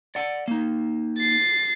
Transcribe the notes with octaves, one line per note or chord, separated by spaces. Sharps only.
D5 F#5
A#3 D#4
A6 C7